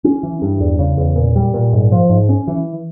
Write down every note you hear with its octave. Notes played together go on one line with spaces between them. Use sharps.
C#4
E3
G2
E2
C#3
E2
A#2
G3
A#2
G#2
F3
G#2
C#4
E3